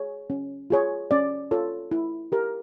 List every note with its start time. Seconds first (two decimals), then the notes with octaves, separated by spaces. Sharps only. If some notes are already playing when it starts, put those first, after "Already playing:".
Already playing: G#4 C#5
0.30 C#4
0.70 F4 G#4 C#5
1.11 C#4 D5
1.51 F4 A4 C#5
1.91 E4
2.32 G4 A#4